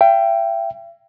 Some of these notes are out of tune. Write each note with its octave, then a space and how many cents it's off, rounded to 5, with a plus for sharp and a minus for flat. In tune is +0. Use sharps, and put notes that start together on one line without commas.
E5 +40 G5 +0